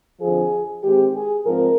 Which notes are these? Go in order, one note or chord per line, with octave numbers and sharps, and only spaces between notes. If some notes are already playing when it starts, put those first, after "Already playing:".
F2 D3 F3 G#4
D#3 G#3 C4 G4
G#4
G#2 F3 C4 A#4